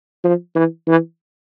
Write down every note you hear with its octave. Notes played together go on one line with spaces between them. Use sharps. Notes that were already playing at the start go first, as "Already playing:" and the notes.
F3
E3
E3